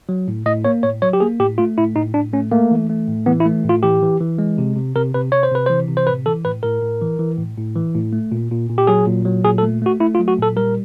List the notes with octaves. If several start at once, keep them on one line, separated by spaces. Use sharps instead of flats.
F#3
A2
A2 D#5
A#3 C#5
A2 C#5
F#3 C#5
G4
A#3 G#4
A2 G4
A3 F4
A2 E4
A2 D#4
A2 D4
A3 C#4
A3 A#3
E3
A3
A2
E3 B3
E4
A3
A2
F4
E3 G4
E3
E3
G#3
C3
C3
C3 A#4
C3 B4
C3 C#5
C5
C3 B4
E3 C5
C3
C5
A2 B4
E3 A4
A2 B4
A2 A#4
A2
E3
E3
A2
A2
E3
A2
A3
A#2
A#2
A#2
G4
F#3 G#4
A#2
F#3
A#2 G#4
A4
A3
A3 F#4
A3 E4
F4
F#3
F#4
A#2 A4
G3 A#4